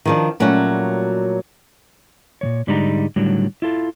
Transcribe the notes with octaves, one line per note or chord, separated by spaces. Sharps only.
D#3 F3 D4
A#2 F#3 G3 A3 C#4 F#4
A#2 E3 C#5
G#2 D3 G3 G#3 D#4 A#5
A2 D3 D#3 F#3 G3
E4 F4 A4